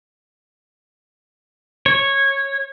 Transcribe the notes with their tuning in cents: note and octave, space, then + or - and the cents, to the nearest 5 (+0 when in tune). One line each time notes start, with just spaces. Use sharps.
C#5 -10